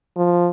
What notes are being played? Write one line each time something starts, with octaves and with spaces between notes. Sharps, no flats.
F3